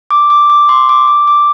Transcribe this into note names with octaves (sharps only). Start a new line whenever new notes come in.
D6
D6
D6
C6
D6
D6
D6